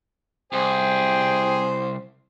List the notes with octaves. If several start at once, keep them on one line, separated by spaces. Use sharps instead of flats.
C2 G#4 C5 G5